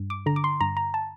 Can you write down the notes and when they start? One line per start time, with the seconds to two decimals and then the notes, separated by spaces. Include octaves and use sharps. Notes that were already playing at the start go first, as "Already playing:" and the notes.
Already playing: G2
0.10 D6
0.26 D3 A#5
0.36 D6
0.44 C6
0.61 G2 A#5
0.77 A#5
0.94 A5